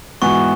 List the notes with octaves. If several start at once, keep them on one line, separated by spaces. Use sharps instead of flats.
G#2 E3 B3 F#4 C#6